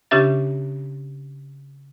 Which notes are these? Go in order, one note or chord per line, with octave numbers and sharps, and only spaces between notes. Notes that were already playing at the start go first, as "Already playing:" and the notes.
C#3 C#4 D4 G4 E5 A6